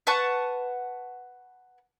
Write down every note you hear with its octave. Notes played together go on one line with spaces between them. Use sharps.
B4 F#5 A5 C#6